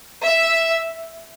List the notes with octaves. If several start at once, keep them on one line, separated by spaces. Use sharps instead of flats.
E5